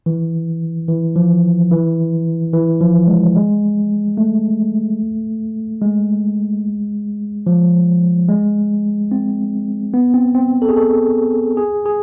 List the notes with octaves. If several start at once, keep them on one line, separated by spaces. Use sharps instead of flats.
E3
E3
F3
E3
E3
F3
G#3
G#3
A3
G#3
F3
G#3
C4
B3
C4
C4
A4
G#4
A4
G#4
G#4